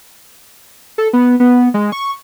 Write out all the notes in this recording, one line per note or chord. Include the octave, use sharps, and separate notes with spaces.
A4
B3
B3
G#3
C#6